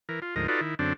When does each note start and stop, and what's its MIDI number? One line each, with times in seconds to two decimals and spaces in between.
0.09 0.20 52
0.09 0.20 70
0.22 0.35 65
0.36 0.47 38
0.36 0.47 44
0.36 0.47 53
0.36 0.47 70
0.36 0.47 75
0.48 0.61 63
0.48 0.61 65
0.48 0.61 66
0.48 0.61 69
0.48 0.61 71
0.48 0.61 74
0.61 0.75 51
0.61 0.75 64
0.79 0.93 42
0.79 0.93 50
0.79 0.93 60
0.79 0.93 62